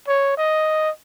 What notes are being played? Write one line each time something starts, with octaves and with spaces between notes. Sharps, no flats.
C#5
D#5